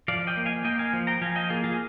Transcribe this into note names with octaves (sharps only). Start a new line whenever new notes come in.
F3 D5 F5
D#5 G5
A#3
F5 G#5
A#3 D#5 G5
F5 G#5
F3
G5 A#5
F3 F5 G#5
D#5 G5
A#3 F4 G#4
F4 G#4